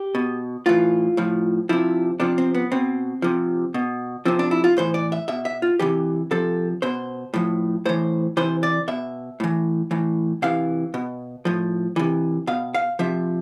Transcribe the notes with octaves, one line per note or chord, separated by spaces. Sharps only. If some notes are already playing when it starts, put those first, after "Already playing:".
Already playing: G4
B2
A2 E3 F4
A2 F3
C3 F3 E4
C3 F3 D4
C4
B3
B2 C4
C3 F3
B2
C3 F3 C4
D4
E4
F4
A2 E3 C5
D5
E5
B2 E5
E5
F4
C3 E3 G4
C3 F3 A4
B2 C5
A2 F3
A2 E3 C5
C3 E3 C5
D5
B2 E5
A2 E3
A2 E3
C3 E3 F5
B2
A2 F3
C3 E3
B2 F5
F5
C3 F3 E5